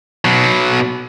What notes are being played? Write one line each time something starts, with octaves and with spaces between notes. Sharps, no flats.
B2 F#3